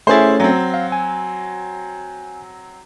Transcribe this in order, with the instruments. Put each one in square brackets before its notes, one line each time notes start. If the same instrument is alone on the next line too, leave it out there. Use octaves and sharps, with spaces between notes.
[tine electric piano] A3 C#4 A6 [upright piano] E4 G#4 C5
[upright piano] F#3 C4
[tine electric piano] F5
G#5